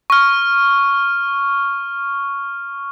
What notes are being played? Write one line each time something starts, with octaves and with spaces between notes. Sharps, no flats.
C#6 F6